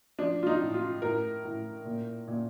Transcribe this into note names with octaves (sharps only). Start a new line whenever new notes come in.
F3 D4
F4
D#4
A2
F4
A2 A#4
A2
A#2
A#2